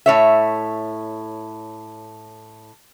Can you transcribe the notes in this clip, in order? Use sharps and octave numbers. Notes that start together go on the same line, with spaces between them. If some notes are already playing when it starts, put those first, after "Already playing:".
A2 C#5 E5